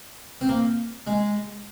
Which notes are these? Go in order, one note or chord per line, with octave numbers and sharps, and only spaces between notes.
C4
A#3
G#3